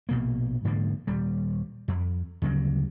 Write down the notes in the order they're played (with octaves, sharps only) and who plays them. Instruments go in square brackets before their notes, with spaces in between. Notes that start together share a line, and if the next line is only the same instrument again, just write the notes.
[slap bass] A#1 B2 A#3
G#2 D3 F3 A#3
D#1 G3
F2
D2 C#3 F#3 G3